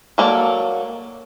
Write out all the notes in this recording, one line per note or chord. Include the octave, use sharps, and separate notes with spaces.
F#3 A#3 A4 D5